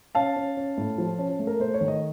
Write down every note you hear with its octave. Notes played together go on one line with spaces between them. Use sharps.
C#4 F5 A5
C#4
C#4
A2
F3
C#4
A3
A#4
A3 C5
C#5
D#3
D#5